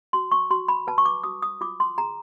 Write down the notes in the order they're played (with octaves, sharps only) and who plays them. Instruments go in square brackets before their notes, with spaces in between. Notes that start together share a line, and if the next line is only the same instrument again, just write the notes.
[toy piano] F#4 C6
C#6
F#4 C6
B5
B4 A5
C#6
D6
F#4 D#6
D#6
F4 D6
C6
G#4 A#5